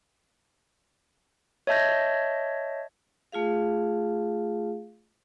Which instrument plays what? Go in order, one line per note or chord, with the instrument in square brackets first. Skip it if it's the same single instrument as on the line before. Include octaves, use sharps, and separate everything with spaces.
[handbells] C#5 D#5 E5 A5 G6 A#6
[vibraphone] A3 F4 G#4 F5